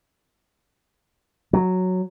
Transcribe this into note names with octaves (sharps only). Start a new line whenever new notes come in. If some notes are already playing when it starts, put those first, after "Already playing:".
F#3